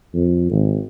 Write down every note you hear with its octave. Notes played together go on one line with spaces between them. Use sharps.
F2
G#1